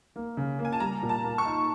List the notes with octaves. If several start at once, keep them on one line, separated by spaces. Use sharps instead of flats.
A#3
C#3
A#3
G#5
A5
G3 A#5
A#2
A5
A#3
C#6
D#4